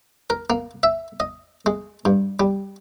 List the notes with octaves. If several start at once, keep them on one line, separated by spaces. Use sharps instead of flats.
A#4
A#3
E5
D#5
G#3
G2
G3